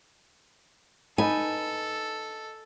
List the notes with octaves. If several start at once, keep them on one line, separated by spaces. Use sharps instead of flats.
D#4 A4 B4 G#5